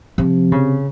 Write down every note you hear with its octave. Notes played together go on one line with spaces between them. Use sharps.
C3 F3
C#3